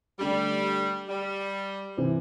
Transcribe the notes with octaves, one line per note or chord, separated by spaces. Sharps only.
D3 G3 A3 D4 G4
G3
C3 E3 C4